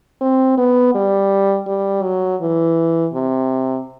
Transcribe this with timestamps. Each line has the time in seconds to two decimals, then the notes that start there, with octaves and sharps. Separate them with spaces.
0.21 C4
0.58 B3
0.95 G3
1.67 G3
2.03 F#3
2.41 E3
3.13 C3